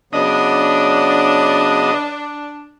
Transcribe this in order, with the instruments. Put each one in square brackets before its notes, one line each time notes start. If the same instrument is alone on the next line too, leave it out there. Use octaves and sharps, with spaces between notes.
[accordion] C#3 F#3 B3 [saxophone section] D4 [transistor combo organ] D#5